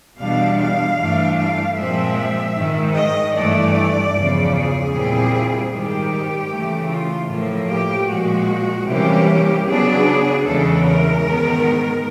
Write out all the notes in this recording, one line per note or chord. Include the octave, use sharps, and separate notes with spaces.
E2 B2 G3 B3 D4 F5
F5
G2 E3 A3 D4
F5
A#2 F3 G#3 C4 E5
G#2 D#3 G#3
D#5
G2 E3 A3 D5
E2 C#3 F3
G#4
A#2 G3 C4 E4
G#2 D#3 G3 G4
C#3 E3 A3
F4
A2 F3 A#3
G4
A#2 F3 G#3 F#4
C3 E3 G3 A#3 C#4 G4
C#3 F#3 B3 D4 G#4
E2 C#3 E3 G#3 A4
A#4
G#2 D#3 G#3 B3